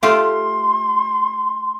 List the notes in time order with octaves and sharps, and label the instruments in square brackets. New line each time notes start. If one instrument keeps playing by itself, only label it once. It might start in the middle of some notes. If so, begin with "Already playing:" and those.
[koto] A3 F4 G4 [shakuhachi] C6